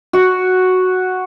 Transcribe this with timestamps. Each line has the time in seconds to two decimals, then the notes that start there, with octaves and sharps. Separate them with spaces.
0.13 F#4